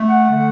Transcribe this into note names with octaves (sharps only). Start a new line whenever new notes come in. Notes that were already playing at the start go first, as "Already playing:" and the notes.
Already playing: A3
F#5
D3 A3